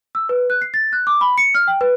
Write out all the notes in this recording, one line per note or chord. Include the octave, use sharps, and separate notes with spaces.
E6
B4
F#6
C7
A6
F#6
D6
B5
C#7
F6
G5
B4